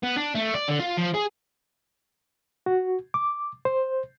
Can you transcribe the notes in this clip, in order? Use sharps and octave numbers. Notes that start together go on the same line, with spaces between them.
B3
D4
A3
D5
D3
F4
F3
G#4
F#4
D6
C5